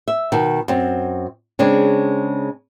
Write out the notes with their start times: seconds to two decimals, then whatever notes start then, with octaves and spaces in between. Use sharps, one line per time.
0.08 E5
0.32 B2 D#3
0.68 F#2 C4
1.59 C#3 G#3 C4 D4